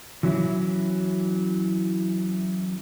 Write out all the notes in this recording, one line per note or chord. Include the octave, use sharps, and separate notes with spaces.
E3 F#3 C#4 E4